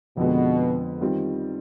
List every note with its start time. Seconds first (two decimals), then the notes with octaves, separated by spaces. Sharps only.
0.17 F2 B2 D3 F3 G#3 B3
1.01 D#3 G3 C4 F4